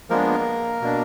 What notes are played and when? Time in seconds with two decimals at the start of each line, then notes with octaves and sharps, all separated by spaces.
0.10 F3 G#3 A#3 B3 D4 A#4
0.81 B2 A#3 D4